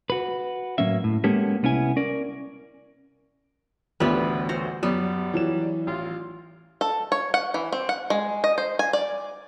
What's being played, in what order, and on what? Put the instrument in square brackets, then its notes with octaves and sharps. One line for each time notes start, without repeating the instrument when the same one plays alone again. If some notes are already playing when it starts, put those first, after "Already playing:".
[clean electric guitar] F#4 B4
A2 F#3 A#3 C#4 E5
A2
G#3 A#3 B3 C#4 G4 A4
C2 B3 C#4 E4 G#5
C#4 A#4 D5
[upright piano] A1 D2 [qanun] G3 B3 [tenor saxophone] B4
[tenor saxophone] F#4 [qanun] C5 A#5
[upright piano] F#2 [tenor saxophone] G3 [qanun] B3
[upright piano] E3 F#3 E7
[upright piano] A1 [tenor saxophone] F4
[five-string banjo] A4
C#5
F#5
E3
C4
F#5
G#3
D#5
C5
G#5
D5